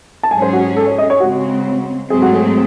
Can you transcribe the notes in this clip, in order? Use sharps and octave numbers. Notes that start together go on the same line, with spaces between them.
A5
G#2 F#3 C#4 G#4 G#5
C5
F#4
A4
C#5
D#5
C#5
C#3 G#3 C4 F#4
G#2 F#3 A3 C4 G#4
F#4
G#4